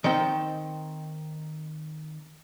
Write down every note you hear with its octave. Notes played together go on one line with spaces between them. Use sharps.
D#3 C4 G5